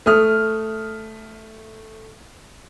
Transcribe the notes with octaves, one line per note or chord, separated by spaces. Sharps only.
A3 D#6 F6